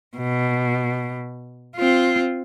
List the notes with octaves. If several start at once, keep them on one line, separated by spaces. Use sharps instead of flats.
B2
C4 F4